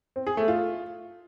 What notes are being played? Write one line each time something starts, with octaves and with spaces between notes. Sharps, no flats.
C4
G#4
A3
F4